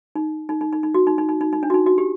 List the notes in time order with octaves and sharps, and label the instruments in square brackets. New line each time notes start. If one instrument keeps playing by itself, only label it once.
[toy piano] D#4
D#4
D#4
D#4
D#4
F#4
D#4
D#4
D#4
D#4
D#4
D4
F#4
D#4
F#4
G4